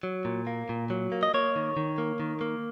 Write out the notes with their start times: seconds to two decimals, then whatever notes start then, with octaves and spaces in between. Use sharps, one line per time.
0.03 F#3
0.25 A#2
0.47 A#3
0.69 A#2
0.90 F#3
1.12 A#3
1.23 D#5
1.34 A#3 C#5
1.56 D#3
1.77 D#3
1.98 A#3
2.20 D#3
2.41 A#3